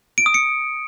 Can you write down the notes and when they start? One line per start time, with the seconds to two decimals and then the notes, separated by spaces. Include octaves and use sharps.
0.18 D7
0.26 D#6
0.34 C#7